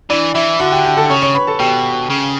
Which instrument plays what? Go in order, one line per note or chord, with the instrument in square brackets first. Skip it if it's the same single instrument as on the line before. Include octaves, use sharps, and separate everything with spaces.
[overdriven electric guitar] E3 [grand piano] D4 D5
[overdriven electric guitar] E3 [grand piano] E4 E5
[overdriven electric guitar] D3 [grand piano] F#4 F#5
[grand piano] G4 G5
G4 G5
A4 A5
[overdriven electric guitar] C#3 [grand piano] C#5 C#6
[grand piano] C#5 C#6
B4 B5
A4 A5
[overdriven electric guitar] B2 [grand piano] G4 G5
[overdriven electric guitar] C#3